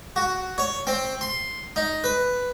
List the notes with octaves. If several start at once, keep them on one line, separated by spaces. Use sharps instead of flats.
F#4
C#5
C4
C6
D#4
B4